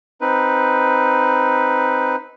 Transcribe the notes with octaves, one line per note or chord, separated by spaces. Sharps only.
C4 D#4 B4